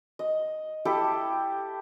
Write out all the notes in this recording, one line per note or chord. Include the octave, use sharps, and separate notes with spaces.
D#5
E4 G4 A4